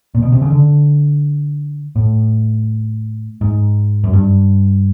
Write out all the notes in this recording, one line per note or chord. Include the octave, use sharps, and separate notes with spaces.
A#2
B2
C3
C#3
D3
A2
G#2
F#2
G2